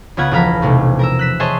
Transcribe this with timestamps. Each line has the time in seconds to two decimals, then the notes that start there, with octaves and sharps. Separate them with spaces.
0.17 C#2 C#3 B3 F4 F#5 G#6
0.31 E1 F3 A4 F5 A#5 B5
0.62 B1 C3 A3
0.99 A#4 A#5 E6
1.19 F#6 B6 E7
1.40 G#4 C5 C#5 D#5 E5 A5